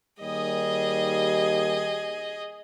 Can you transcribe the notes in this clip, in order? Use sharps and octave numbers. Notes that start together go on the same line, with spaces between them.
D#2 G3 G#4 D#5